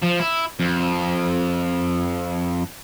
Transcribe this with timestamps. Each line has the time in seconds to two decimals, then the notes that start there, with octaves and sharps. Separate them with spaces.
0.03 F3
0.20 E4
0.60 F2